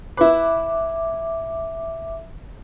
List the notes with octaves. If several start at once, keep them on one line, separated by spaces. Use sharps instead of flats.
E4 B4 E5 D6